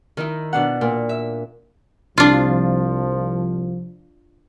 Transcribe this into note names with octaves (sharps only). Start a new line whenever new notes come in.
D#3 D#4 E4
B2 D4 F#5
A#2
E5
C2 F3 D4 F4